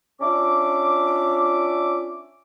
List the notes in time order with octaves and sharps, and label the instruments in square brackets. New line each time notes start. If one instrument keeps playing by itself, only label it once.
[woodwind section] C#4 D4 F4 E5 D6